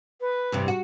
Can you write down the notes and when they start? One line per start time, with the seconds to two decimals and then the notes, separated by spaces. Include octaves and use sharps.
0.21 B4
0.52 E2 G2 C3
0.68 F#4